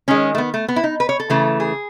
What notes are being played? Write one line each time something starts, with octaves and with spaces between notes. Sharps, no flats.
D#3 G#3 C#4
A3
B3
A3
B3
E4
D#4
B4
C#5
A4
C#3 E3 A3
G#4